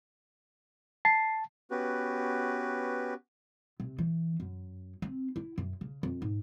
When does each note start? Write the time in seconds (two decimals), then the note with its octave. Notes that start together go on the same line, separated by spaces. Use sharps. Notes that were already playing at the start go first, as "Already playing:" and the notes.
1.05 A5 C7
1.71 B3 C#4 F#4 G4 B4
3.80 C3
3.98 E3
4.40 F#2
5.02 C4
5.36 E4
5.58 F#2
5.81 C#3
6.03 F2
6.22 G#2